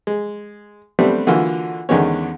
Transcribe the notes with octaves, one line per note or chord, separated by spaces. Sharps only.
G#3
G3 A3 B3 C4 D4
D3 E3 A#3 F4 F#4
E2 D3 D#3 G#3 B3 C#4